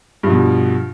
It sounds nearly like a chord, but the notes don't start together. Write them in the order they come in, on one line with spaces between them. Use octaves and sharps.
G2 F3 B2